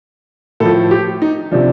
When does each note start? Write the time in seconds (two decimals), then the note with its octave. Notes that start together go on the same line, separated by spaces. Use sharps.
0.60 A2 A4
0.65 F3
0.91 G4
1.22 D#4
1.52 C3 F3 D4